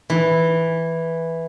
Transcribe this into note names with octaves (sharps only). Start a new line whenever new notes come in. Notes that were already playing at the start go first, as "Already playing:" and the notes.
E3